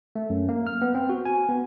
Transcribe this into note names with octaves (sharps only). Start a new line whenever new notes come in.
A3
F#2
A#3
F6
B3
C4
F#4
G#5
B3